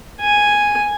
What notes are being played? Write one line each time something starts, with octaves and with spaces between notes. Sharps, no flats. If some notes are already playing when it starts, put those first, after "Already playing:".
G#5